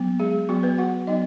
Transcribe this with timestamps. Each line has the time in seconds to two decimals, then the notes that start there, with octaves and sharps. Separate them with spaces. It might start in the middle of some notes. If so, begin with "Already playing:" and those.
Already playing: F#3 B3
0.20 G#3 G#4
0.49 F#3 B3 F#4
0.63 B3 B4
0.78 F#4 F#5
1.07 F#3 B3 D#4 D#5